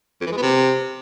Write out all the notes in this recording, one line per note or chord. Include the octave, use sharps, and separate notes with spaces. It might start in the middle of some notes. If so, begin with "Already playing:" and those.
F2
E3
G#3
B3
C3